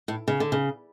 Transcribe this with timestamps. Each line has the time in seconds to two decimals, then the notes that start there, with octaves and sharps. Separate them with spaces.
0.08 A2
0.28 C#3
0.40 D3
0.52 C#3